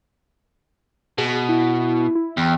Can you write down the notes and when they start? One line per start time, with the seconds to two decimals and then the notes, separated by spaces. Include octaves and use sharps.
1.18 B2 G#4
1.49 E4
2.15 E4
2.37 E2 G5